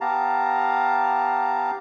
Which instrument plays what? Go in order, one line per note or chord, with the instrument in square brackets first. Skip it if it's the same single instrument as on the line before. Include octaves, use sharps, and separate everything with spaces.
[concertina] B3 G4 F5 A5 A#5